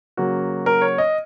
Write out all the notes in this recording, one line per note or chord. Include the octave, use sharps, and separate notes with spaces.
C#3 F#3 A#3 F#4
A#4
C#5
D#5